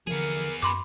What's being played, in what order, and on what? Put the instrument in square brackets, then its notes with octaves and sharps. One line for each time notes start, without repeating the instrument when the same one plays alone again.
[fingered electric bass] D3 E3 F3 [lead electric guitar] B3 G#4 [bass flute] A#4
[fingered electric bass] F#2 [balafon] B5 C6 D6